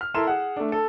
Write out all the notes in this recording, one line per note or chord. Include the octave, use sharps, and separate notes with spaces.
F6
E4 A4 A#4 C6 E7
G#4 F#5
A3 D4
A4